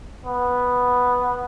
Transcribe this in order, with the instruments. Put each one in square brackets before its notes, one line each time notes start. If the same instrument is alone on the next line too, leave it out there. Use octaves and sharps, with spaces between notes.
[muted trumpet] B3